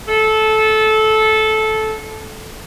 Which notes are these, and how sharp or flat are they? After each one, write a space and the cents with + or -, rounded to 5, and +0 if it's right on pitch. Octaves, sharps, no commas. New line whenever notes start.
A4 -15